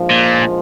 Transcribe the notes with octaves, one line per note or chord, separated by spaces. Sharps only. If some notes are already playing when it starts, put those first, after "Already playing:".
Already playing: A#1 G#2 F3
A#2